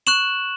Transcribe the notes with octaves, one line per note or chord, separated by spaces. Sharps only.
C#6 F#6 E7 F#7